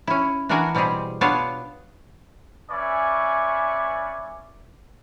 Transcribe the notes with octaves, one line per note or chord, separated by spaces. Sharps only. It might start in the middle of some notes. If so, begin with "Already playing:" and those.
C#4 E4
E3 D4 F#4 A#4 D5 G#5
B2 G3 C4 G4 G#4
B3 D4 F4 C#5 F5 A5
C#4 B4 D5 E5 G#5 C#6